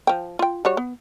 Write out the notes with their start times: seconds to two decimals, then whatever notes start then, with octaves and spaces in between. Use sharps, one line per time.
0.07 F3 G5
0.39 F4 G5
0.65 G3 F#4 C#5
0.77 B3